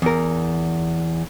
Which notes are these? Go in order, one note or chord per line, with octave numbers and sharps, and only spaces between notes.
E2 A#4